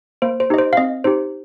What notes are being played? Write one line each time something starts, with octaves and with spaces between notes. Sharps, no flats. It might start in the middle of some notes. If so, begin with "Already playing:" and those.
A#3 C5
C5
D#4 G4 D#5
C5
F5
C4 D#5
D#4 G4 C5